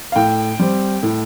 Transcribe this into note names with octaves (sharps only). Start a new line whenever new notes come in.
F5
A2 G5
G3 C4
A2